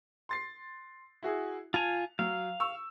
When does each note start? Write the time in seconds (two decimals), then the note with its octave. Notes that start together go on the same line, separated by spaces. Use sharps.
0.29 C6 A6 C7
1.23 E4 F#4 G#4
1.74 F4 G#5 A5 F7
2.19 F#3 F5
2.60 C#6 E6